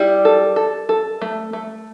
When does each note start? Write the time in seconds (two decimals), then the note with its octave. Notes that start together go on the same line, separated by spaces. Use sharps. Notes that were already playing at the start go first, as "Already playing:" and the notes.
Already playing: G3 E4
0.25 A4
0.56 A4
0.89 A4
1.22 A3
1.53 A3